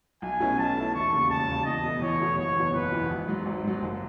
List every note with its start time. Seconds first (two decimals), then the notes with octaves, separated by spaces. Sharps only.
0.22 B1 G#5
0.40 B2 A3 C#4 E4
0.58 B1 A5
0.77 B2 A3 C#4 E4
0.94 E1 C#6
1.13 D#2 C#3
1.30 E1 A5
1.48 D#2 C#3
1.66 E2 D#5
1.84 B2 A3
2.02 E2 C#5
2.20 B2 A3
2.38 F#1 C#5
2.56 E2 B2
2.74 F#1 B4
2.92 E2 B2
3.10 G#1
3.28 G#2 F#3
3.45 G#1
3.64 G#2 F#3
3.82 F#1